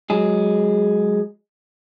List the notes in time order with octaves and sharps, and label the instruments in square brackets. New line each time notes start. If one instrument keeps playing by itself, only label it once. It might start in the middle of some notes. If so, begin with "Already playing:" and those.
[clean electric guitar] F#3 G#3 G#4